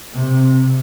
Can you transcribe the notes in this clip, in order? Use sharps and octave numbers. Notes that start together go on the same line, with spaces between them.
C3